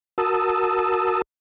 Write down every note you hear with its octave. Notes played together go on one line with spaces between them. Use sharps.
F#4 A#4 A5 D#6 E6